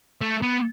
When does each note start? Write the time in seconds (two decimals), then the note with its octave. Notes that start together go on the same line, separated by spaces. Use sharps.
0.21 A3
0.42 B3